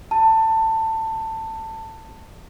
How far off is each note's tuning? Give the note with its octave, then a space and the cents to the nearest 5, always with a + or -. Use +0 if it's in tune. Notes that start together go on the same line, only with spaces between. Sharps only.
A5 +20